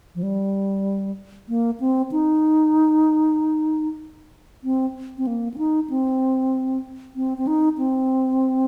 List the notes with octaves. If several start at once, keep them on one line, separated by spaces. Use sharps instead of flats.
F3
G3
A#3
C4
D#4
C4
C4
A#3
C4
D#4
C4
C4
C4
D#4
C4